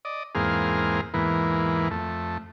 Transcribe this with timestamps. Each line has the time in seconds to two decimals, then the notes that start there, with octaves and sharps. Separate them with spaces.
0.05 D5 D#5
0.35 E2 G#2 A#3 C4 G#4 F5
1.14 E2 G#2 E3 A#3 B3
1.91 F2 A3